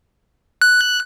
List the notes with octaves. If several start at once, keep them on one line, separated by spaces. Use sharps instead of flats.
F#6